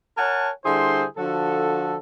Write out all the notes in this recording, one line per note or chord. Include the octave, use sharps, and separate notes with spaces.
A#4 C#5 F#5 G#5 A5
D3 G3 E4 G#4 C5 C6
D3 F3 F#4 A4